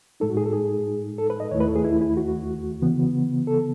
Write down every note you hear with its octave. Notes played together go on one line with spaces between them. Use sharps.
A2 G#3 D#4 A4
F#4
G#4
A4
G#4
A4
B4
D#5
D#2 D#3 A3 E4 C#5
B4
A4
G#4
E4
E4
F#4
C#3 E3 B3
A4